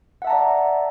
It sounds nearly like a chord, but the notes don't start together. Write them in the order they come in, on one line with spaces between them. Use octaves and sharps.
F#5 E5 A5 A#5 D5